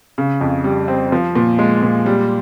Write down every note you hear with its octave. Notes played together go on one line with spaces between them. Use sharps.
C#3
F2
G3
C4
F3
A#2
G#3
A#2
G3